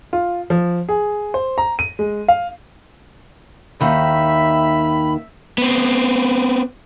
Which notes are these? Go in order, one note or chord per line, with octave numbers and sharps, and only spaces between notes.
F4
F3
G#4
C5
A#5
D#7
G#3
F5
D#2 D#3 E5 B5
B3 C4